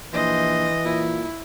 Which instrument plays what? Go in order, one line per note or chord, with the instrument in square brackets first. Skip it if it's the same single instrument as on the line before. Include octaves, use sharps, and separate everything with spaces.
[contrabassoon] A#1 [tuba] E3 [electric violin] C5 [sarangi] D#5
[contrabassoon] A#2 [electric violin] E4